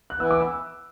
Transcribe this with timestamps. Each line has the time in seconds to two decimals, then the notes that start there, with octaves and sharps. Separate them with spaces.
0.10 F#6
0.18 E3 B3 E4 B4 E6
0.31 D6
0.41 E6